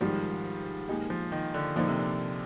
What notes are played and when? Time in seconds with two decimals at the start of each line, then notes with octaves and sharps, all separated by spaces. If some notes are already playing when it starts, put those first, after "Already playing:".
0.01 G#2 D#3 F3 G3
0.89 A#2 G#3 D#4 G4
1.10 F3
1.32 D#3
1.54 D3
1.76 A#2 D3 F3 A#3 D#4
1.88 C3
1.99 D3